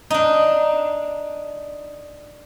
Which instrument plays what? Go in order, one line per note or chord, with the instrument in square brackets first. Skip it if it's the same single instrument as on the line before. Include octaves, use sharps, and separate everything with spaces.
[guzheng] D4 D#4